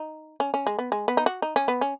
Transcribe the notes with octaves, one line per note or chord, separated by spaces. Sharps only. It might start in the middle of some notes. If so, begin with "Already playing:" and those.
Already playing: D#4
C#4
C#4
G#3
B3
G#3
B3
D#4
F#4
D#4
C#4
B3
C#4